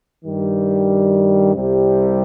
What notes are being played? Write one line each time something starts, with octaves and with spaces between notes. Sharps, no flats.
G2 D#3 G3
C2 C3 G3